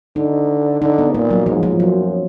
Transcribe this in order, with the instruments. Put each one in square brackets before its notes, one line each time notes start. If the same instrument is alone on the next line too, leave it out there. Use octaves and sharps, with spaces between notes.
[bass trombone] D3 [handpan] D#4
[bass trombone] D3 [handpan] D#4
[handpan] B3
[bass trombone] A#2 [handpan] A#3
[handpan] F#3
[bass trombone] G#2 [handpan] F3
[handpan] F3
[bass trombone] F#2 [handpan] F#3